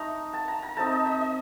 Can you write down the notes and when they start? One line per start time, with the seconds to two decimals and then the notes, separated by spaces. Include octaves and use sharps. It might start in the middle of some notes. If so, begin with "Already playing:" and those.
Already playing: A3 D#4 A#5
0.33 A5
0.48 A#5
0.63 A#5
0.77 A3 C4 D#4 A5
0.92 D#5
1.06 D#5
1.21 D#5